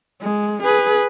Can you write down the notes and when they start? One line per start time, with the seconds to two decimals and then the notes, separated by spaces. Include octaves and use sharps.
0.22 G#3
0.63 G#4 B4